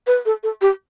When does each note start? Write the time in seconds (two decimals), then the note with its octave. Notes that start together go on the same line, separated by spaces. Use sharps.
0.07 B4
0.26 A4
0.43 A4
0.61 G4